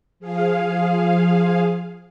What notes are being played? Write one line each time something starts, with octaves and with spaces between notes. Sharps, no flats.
F3 G#4 F5